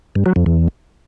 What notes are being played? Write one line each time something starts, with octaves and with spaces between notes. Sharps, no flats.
G2
F#3
F2
E2